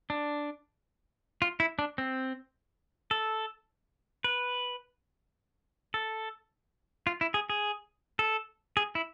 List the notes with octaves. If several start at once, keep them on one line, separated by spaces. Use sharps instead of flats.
D4
F4
E4
D4
C4
A4
B4
A4
F4
E4
G#4
G#4
A4
G#4
E4